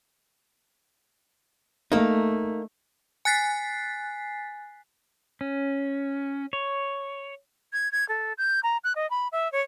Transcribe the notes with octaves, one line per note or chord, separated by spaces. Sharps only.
A3 A#3 D#4
G#5 F#6 A6 B6 C7
C#4
C#5
G#6
G#6
A4
G6
A#5
F#6
D#5
B5
E5
C#5